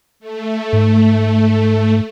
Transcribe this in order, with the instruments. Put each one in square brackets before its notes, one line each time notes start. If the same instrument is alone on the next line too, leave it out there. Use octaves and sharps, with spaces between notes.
[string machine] A3
[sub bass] G#2